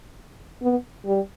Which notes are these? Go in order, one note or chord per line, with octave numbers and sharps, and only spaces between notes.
B3
G3